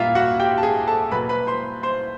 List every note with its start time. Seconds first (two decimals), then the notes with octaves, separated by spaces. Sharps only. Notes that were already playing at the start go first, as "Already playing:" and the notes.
Already playing: A#2 G3 A#3 F4 E5 F5
0.15 F#4 F#5
0.40 G4 G5
0.58 A5
0.63 G#4 G#5
0.87 A4 A5
1.11 B2 F#3 A#3 B4 B5
1.29 B4 B5
1.47 C5 C6
1.83 C5 C6